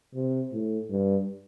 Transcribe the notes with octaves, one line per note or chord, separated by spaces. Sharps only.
C3
A2
G2